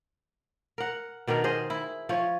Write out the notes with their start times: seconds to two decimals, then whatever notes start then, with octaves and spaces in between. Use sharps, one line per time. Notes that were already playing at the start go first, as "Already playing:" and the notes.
0.78 A#4 F#5
1.27 B2 D#3 D4 A#4
1.44 G#4 C5 D#5
1.70 E4
2.09 F3 C#5